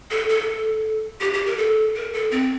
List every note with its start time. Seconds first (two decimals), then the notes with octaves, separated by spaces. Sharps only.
0.11 A4
0.29 A4
1.21 G4
1.33 G4
1.46 A#4
1.58 A4
1.95 A#4
2.13 A4
2.31 C4